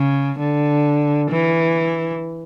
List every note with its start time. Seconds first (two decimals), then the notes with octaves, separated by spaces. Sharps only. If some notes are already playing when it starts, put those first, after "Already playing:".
Already playing: C#3
0.39 D3
1.31 E3